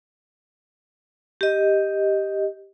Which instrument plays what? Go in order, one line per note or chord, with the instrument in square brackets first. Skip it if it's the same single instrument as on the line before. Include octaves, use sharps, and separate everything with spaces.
[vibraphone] G4 D#5